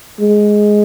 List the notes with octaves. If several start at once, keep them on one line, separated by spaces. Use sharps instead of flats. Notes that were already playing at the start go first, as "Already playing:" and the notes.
G#3